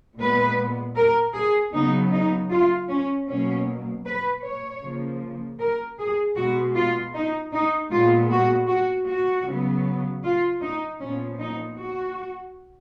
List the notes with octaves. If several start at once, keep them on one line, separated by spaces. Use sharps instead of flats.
A#2 G#3 B3 B4
A#4
G#4
C#3 F#3 B3 D#4
D#4
F4
C#4
B2 F#3 A#3 C#4
B4
C#5
C#3 F3 A#3
A#4
G#4
B2 G#3 B3 F#4
F4
D#4
D#4
A#2 G#3 B3 F4
F#4
F#4
F#4
C#3 F#3 B3
F4
D#4
A#2 F3 B3 C#4
D#4
F#4